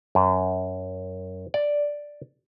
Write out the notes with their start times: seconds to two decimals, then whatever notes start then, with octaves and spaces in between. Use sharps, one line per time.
0.15 F#2
1.54 D5